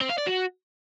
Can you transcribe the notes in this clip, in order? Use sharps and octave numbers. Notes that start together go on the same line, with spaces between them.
C4
F5
D5
F#4